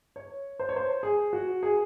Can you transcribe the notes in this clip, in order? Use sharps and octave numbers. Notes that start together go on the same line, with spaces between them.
C#5
C5
C#5
C5
G#4
F#4
G#4